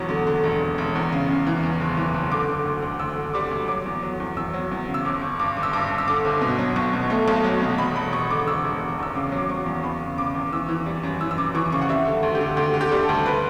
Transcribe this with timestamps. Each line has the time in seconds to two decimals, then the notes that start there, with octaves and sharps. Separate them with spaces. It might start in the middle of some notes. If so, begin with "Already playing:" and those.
Already playing: E1 E2 F#3 C#6
0.09 D3
0.27 D3
0.44 E1
0.61 E1
0.78 E1
0.95 E2
1.12 C#3
1.29 C#3
1.47 E3
1.63 E2
1.80 F#1
1.97 E3
2.14 F#1
2.31 D3 D6
2.49 D3
2.66 D2
2.82 D2
3.00 D2 E6
3.16 D3
3.34 G3 D6
3.51 D2
3.68 F#3 D6
3.86 E2
4.03 F#3
4.20 E2
4.37 E2 E6
4.54 F#3
4.71 E2
4.88 C#3
4.94 E6
5.05 G1 D6
5.22 G1
5.39 G2 D6
5.57 G1
5.63 E6
5.73 G2 D6
5.90 G2
5.98 E6
6.08 D3 D6
6.25 G1
6.41 B2
6.59 F#3
6.76 B1 C#6
6.93 B2
7.10 A3
7.28 B1
7.44 F#3
7.62 B2
7.78 E1 B5
7.96 E1 B5
8.12 E1 C#6
8.30 D3 D6
8.47 D3 E6
8.64 E1
8.81 E1
8.99 E2 E6
9.15 C#3 D6
9.32 F#3
9.38 D6
9.49 F#3 C#6
9.66 E2
9.83 E2 B5
10.01 C#3
10.17 C#3 D6
10.35 E2
10.52 E3 E6
10.69 E3
10.86 G3
11.03 F#2
11.21 E3 E6
11.31 E6
11.37 F#2 D6
11.55 E3 C#6
11.72 C#3 C#6
11.81 F#5
11.89 G3 E5
12.06 D3
12.23 D2
12.35 G4
12.41 D3
12.57 D2 G4
12.74 D3
12.81 G4
12.91 G3
13.03 A4
13.09 D2
13.26 B4